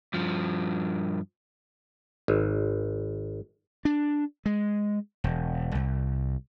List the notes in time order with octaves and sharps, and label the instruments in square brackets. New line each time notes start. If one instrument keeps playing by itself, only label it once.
[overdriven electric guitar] G2 F3
[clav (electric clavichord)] G#1
[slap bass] D4
G#3
E1
C2